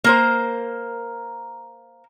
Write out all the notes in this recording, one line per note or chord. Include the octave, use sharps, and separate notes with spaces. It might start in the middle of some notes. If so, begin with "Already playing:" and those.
A#3 A#4 C5